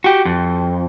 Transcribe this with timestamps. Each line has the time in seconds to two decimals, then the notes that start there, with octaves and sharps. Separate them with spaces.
0.04 F#4 G4
0.25 F2